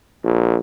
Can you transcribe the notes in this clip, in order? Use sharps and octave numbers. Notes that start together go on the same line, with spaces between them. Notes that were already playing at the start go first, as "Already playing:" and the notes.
A#1